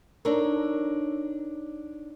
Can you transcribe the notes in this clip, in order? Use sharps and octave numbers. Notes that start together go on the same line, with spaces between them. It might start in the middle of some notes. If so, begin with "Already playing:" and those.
D4 D#4 A4 A#4 C#5